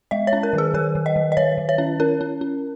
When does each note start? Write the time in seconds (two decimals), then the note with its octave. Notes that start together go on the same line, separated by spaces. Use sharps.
0.11 G#3 D#5
0.27 C#5
0.33 C#4
0.43 A#4
0.53 D#3
0.58 G#4
0.74 D#3 A#4
0.95 D#3
1.06 D#5
1.16 D#3
1.32 D#5
1.37 D#3 C#5
1.58 D#3
1.69 C#5
1.78 C#4
2.00 C#4 A#4
2.21 C#4
2.41 C#4